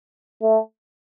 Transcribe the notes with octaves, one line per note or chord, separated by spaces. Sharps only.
A3